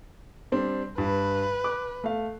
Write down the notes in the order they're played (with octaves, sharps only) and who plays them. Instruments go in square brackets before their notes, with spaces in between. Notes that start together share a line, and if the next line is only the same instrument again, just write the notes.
[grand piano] G3 C4 D4
[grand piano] G2 [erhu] B4
[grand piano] D6 F#6
A3 F5